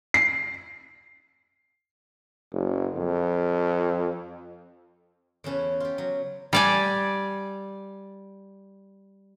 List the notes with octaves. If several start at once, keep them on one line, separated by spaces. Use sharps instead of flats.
C7
F#1
F2
E2 C#3 C#4 B4 A5
F4 G4
F#3
G3 D5 G#5